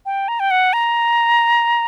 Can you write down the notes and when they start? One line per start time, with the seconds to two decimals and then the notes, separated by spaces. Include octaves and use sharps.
0.06 G5
0.28 A#5
0.40 G5
0.51 F#5
0.73 A#5